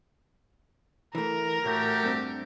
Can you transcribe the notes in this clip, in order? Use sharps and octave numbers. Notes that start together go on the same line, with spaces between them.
E3 A3 A#4
A2 A3 F#4 G4
G2 C4